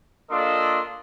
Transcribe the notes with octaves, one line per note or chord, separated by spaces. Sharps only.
A#3 D4 F4 A4 D#5 C6